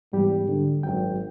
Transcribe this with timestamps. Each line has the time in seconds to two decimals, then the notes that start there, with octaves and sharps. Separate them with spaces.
0.13 E2 G#2 G3 G4
0.48 D3
0.83 G#1 F#2 F#3 G5